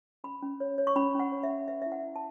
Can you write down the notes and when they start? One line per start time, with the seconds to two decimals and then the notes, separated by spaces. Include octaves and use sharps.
0.24 C#4 B5
0.42 C#4
0.60 C#5
0.78 C#5
0.87 C#6
0.96 C#4 B5
1.15 C#4 F#5
1.32 C#5
1.43 E5
1.49 C#4
1.68 B4 E5
1.82 E4 E5
1.92 F#5
2.03 E4
2.16 A5